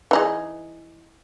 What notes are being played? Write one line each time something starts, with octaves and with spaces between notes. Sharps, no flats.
E3 D#4 G#4